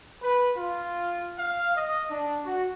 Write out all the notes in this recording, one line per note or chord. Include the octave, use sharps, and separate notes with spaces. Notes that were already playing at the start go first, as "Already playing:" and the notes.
B4
F4
F5
D#5
D4
F#4